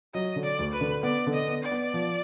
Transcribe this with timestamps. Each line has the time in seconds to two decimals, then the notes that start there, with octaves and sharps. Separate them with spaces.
0.14 F#3 D#5
0.36 D3
0.44 D5
0.59 D2
0.73 B4
0.81 D3
1.03 B3 D5
1.27 D3
1.34 D#5
1.48 B3
1.63 D5
1.71 B3
1.94 F3